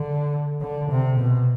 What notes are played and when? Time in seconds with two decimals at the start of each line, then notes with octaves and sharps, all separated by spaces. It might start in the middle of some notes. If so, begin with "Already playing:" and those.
Already playing: D3
0.61 D3
0.90 C3
1.19 B2